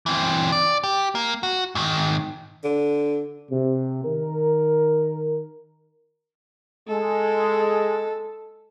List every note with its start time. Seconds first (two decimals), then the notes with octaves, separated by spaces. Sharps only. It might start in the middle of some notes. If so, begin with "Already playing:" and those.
0.06 E3 C4
0.52 D5
0.83 G4
1.15 A#3
1.43 F#4
1.75 G#2 D#3
2.64 D3
3.51 C3
4.04 D#3 A#4
6.88 G#3 A4